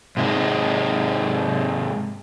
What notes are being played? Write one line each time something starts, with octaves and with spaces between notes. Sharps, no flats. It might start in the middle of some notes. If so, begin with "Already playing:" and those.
G#2 C3 G#3 D#4